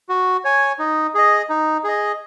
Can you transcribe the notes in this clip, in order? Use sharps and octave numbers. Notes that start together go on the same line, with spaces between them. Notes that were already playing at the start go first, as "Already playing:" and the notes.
F#4
C#5 G#5
D#4
G#4 D#5
D#4
G#4 D#5